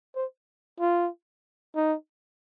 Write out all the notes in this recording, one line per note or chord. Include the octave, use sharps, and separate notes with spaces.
C5
F4
D#4